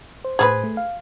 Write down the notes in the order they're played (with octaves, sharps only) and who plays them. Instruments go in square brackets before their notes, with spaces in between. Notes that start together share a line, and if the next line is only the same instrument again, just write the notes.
[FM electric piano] C5
[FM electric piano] A2 C5 [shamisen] G#4 A4 B4
[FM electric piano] A3
F5